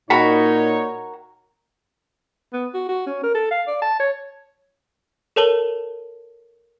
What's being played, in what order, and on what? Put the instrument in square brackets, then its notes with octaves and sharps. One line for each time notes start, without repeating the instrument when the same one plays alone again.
[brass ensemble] A#2 D#4 C#5 [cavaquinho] F#4 A#4 B5
[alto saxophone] B3
F#4
F#4
C#4
A#4
A4
F5
D5
A5
C#5
[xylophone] A4 A#4 C#5 A5 F#7 G7